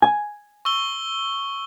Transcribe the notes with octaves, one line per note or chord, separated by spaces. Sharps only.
G#5
C#6 E6 G7